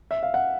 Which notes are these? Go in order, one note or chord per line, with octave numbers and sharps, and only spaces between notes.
E5
F5
F#5